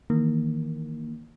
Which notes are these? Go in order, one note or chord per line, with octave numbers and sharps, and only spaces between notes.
D#3 E3 A#3